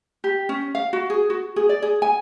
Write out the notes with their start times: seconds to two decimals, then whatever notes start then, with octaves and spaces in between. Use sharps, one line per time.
0.24 G4
0.49 C#4
0.75 F5
0.93 F#4
1.10 G#4
1.30 F#4
1.56 G#4
1.69 D5
1.82 G#4
2.02 G#5